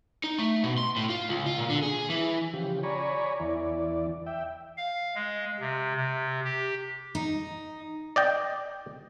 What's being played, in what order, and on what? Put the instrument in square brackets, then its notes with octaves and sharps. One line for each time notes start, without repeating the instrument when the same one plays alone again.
[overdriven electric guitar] D#4
A3
B2
C6
A2
F4
C#2
F4
A#2
D3
G#4
E3
[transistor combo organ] C#3 F3 G4
C#5 D5 G#5 A#5 B5 C#6
E2 E3 D5
E5 G5
[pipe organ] F5
G#3
C3
C3
G4
[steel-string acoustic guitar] D#4
[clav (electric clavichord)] D5 D#5 G5